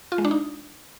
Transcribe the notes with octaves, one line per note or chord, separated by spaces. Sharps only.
F4
G#3
D4
D#4